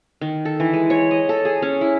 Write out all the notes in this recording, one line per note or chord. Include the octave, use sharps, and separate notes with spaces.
D#3
A4
E3
G#3
C#5
D#5
A4
G#4
C#4
E4